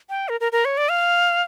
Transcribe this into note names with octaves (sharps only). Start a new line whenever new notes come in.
G5
A#4
A#4
A#4
C#5
D5
F5